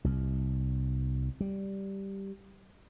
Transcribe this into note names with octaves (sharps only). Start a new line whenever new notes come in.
C2
G3